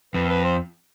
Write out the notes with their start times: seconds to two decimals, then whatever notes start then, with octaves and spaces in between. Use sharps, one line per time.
0.14 F2 B4
0.30 B4
0.44 C5